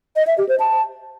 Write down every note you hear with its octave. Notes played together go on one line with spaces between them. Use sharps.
D#5
E5
G4
C5
A5